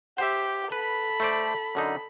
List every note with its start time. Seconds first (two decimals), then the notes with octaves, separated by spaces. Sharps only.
0.18 G4 C5 E5
0.72 A4 B4 B5
1.20 A3 C5 D5
1.75 F#2 D3 D#4